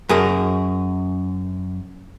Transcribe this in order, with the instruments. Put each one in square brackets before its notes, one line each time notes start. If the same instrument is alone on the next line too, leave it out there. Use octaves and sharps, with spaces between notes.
[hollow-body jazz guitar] F#2 G#4 A#4